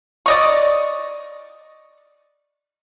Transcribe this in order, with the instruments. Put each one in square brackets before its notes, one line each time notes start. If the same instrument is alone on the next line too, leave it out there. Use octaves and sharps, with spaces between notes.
[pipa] D5 D#5 C#6